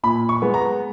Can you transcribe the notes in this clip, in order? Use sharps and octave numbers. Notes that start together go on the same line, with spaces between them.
A#2 B5
C#6
G#3 B3
A#5